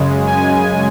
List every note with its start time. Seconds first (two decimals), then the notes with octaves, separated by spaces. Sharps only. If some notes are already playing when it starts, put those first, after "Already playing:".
Already playing: F#2 C#3 G#3
0.27 G#5